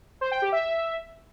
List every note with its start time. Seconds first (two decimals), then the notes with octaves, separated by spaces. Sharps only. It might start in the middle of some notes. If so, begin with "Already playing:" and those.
0.21 C5
0.31 G5
0.42 G4
0.52 E5